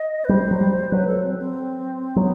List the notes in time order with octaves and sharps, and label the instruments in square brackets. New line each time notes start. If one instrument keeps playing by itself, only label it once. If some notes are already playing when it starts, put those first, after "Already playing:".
Already playing: [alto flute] D#5
B4
[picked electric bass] G3 [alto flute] C5
[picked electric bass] F#3
G3
[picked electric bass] F#3 [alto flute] B4
[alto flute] A4
C4
C4
[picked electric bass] F#3 [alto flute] B3